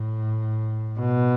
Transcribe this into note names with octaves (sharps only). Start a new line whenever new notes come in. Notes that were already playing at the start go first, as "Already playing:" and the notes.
Already playing: A2
B2